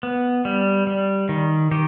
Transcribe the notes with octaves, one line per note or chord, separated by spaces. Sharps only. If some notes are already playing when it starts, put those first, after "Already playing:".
B3
G3
G3
D#3
D#3 G4